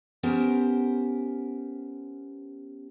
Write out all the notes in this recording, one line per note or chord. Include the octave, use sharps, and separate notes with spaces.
B3 C#4 G4 A#4 C5